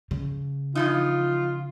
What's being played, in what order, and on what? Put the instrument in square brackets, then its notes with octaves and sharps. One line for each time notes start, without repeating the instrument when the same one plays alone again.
[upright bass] C#3
[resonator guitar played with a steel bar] E3 F3 D#4 [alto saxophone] F4